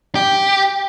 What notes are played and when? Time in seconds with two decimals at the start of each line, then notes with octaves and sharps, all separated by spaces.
0.15 G4